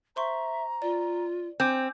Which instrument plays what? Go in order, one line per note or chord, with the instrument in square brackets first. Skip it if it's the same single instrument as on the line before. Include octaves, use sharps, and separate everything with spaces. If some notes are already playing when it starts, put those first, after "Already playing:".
[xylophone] C5 C6 C#6 [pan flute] E5 [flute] A#5
[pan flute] F4 [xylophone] D5
[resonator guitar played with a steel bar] C4 [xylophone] G#5 D6 G6